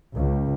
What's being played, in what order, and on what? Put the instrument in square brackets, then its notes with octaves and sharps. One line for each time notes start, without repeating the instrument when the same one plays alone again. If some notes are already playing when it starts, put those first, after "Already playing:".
[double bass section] C#2